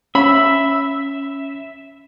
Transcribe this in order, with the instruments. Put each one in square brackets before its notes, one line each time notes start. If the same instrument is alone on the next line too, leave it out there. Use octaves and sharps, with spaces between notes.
[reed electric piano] C#4 [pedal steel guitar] E5 [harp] B5